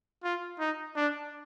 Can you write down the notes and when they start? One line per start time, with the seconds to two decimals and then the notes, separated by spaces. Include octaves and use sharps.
0.23 F4
0.60 D#4
0.96 D4